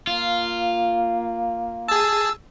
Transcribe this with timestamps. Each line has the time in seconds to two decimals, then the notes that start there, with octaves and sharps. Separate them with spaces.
0.07 A#3 F4
1.88 G#4 A5 E6